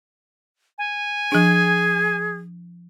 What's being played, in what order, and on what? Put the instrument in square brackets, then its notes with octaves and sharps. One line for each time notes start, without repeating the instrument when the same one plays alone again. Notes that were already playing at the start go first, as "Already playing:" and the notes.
[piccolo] G#5
[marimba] F3 D4 [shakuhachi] G#4